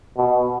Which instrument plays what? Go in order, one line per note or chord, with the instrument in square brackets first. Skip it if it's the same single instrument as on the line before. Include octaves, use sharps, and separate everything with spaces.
[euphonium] B2